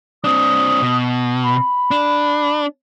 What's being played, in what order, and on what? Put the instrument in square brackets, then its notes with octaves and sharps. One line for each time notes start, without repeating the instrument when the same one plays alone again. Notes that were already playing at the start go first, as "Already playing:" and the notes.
[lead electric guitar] C4 D4 [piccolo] D#6
[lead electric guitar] B2
[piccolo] B5
[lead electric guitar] D4